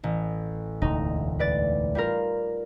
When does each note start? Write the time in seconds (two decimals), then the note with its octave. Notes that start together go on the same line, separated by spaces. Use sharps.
0.04 A1
0.82 E1 D2 D#4
1.39 B4 D5 A6
1.95 G3 F4 A#4